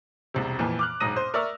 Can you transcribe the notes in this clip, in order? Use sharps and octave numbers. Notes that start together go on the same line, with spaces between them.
E1 C2 C3
F2 A#2 E3
D6 F6 F#6
E1 B1 G#2 D#6 A#6 D#7
C5
A#4 D5 E5 C#6 E6 F6